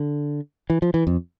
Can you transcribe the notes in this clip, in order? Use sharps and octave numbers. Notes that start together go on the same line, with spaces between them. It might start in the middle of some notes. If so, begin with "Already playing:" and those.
Already playing: D3
E3
F3
E3
F2